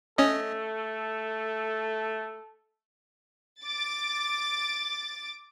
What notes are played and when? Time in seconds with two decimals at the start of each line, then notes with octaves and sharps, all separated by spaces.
0.18 A3 C#4 A4 D#5
3.62 D6 A6